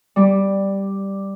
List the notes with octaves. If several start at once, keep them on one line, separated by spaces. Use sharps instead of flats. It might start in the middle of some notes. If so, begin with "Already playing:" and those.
G3 G4